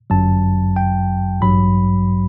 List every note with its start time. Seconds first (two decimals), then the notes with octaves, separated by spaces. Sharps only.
0.10 G1 F#2 F#3 A5
0.76 G5
1.41 A1 G2 F#3 B5